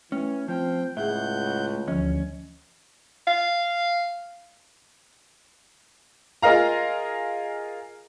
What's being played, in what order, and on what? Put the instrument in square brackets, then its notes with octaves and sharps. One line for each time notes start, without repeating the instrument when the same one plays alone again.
[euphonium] E3 [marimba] A3 [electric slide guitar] C#4
[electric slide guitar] F3 [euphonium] C4 [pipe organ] G5
[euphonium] C#2 [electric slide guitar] A2 [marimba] G#4 E5 [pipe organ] F#5 G6
[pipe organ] D2 [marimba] E3 F3 [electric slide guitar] C#4
[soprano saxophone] F5
[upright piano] F4 G#4 A#4 D#5 F5 A#5